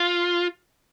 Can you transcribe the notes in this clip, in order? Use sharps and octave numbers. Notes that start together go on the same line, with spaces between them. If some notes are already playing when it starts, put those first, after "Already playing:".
Already playing: F4